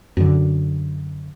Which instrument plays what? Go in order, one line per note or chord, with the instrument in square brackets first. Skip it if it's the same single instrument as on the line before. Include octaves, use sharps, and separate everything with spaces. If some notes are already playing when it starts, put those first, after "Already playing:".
[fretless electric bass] F#2 D3